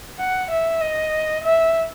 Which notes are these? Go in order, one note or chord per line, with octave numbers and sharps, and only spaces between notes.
F#5
E5
D#5
E5